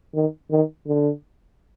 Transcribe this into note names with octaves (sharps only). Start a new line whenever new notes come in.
D#3
D#3
D3